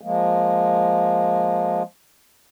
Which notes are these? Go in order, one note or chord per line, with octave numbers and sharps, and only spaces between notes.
F3 G#3 A#3